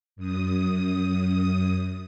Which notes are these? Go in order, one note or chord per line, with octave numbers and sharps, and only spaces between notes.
F#2 D#6